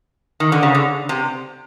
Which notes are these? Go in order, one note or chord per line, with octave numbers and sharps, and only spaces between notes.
D#3
D3
C#3
D3
C3